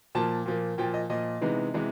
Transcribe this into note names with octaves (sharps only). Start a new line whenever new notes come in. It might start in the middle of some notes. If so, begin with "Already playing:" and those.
A#2 F3 A#3 A5
A#2 F3 A#3
A#2 F3 A#3 G5
D#5
A#2 F3 A#3 D#5
C3 E3 G#3 B3 D#4
C3 E3 G#3 B3